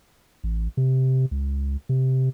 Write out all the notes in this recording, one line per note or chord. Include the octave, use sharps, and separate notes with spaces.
A1
C3
C#2
C3